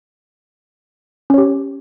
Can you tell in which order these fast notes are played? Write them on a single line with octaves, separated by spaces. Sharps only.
C#4 C#5 G4